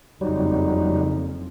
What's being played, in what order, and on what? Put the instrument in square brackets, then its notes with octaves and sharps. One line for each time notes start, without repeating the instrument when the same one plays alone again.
[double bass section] F#1 F2 [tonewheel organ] F#3 G3 [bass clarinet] D#4